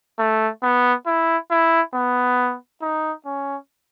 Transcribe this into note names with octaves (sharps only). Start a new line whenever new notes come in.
A3
B3
E4
E4
B3
D#4
C#4